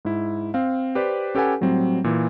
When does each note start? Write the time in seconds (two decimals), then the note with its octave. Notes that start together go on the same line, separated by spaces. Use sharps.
0.05 G#2 E4
0.54 C4 F5
0.95 G4 B4 C5 D5
1.35 C#4 G4 A4 B4 F#5 G#5
1.61 A2 F#3 G3 C4
2.04 A#2 E3